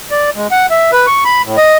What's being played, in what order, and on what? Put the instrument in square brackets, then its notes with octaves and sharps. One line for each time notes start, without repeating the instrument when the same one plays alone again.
[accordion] D5
G#3
F#5
E5
B4
C#6
B5
A2
D#5